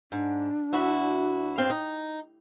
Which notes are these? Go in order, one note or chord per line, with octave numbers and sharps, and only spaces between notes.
G#2 D4
D2 E4 F#4
G2 C4 F5
D#4